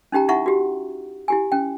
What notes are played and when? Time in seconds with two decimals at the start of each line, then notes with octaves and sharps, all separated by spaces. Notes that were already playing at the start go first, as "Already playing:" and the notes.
0.12 C#4 D#4 G4 G5 A#5
0.29 D#4 E4 E5 F#5 A#5 C#6
0.46 F#4 G4
1.28 E4 G4 G#5
1.52 C#4 G5